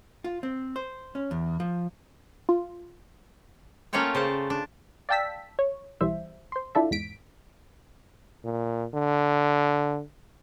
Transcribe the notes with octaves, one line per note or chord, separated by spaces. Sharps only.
F4
C4
C5
C#4
E2
F3
F4
A3 A#3 C#4 F4 C#5 G5
C#3 C5 D5 A5
D4
D5 F5 G5 A5 E6 B6
C#5
B1 E3 G3 C5 E5
C5 C6
D4 E4 F4 A4 D5 E5
E2 G#2 B6 D7
A#2
D3